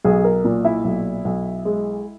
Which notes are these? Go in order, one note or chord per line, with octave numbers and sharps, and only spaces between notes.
B1 G#4
A#4
A#2
E4 E5
B1
B1
G#3